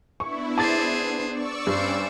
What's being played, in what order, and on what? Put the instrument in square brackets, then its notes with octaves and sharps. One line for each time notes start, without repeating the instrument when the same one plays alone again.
[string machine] B3 D4 [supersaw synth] E4 [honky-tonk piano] C#6
[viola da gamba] G#4 C5 [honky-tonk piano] A5 D6 A6
[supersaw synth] D5 C#6 E6
[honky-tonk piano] G2 [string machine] C#4 G4 G#5 [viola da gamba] C5